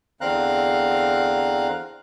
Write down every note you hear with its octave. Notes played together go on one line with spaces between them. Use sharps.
E2 D3 C4 F5 A#5 F#6